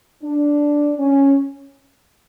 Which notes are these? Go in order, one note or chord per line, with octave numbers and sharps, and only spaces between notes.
D4
C#4